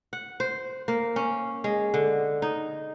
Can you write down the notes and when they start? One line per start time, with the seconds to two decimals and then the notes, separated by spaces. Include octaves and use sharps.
0.13 F#5
0.40 C5
0.88 A#3
1.16 C#4
1.64 G#3
1.94 D3
2.42 D#4